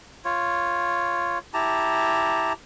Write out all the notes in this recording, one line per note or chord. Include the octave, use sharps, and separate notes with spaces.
F4 C#5
E4 G4 A5 A#5